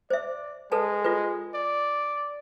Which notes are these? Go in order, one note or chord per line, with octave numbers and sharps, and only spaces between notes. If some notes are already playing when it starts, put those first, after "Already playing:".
C5 D5 E5
G#3 A4 B4 A5
F4 A4 B4
D5